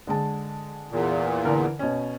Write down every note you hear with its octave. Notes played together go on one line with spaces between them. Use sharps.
D3 G#3 A5
E2 A#2
D3 E3 A#4
B2 C#4